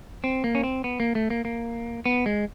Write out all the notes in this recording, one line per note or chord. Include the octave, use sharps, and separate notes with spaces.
C4
A#3
C#4
C4
B3
A#3
A3
A#3
A#3
B3
G#3